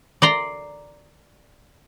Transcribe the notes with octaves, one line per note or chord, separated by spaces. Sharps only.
D5 A#5 C6